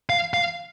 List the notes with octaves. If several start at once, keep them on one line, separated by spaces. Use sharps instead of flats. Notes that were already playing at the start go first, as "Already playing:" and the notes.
F5
F5